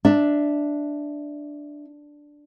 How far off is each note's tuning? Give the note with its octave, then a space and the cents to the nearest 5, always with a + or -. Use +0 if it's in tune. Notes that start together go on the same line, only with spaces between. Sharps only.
D4 +0 E5 -10